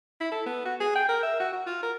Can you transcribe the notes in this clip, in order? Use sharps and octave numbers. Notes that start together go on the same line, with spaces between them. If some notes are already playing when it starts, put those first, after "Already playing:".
E4
A4
B3
F#4
G#4
G5
A#4
E5
F#4
F#4
F4
A#4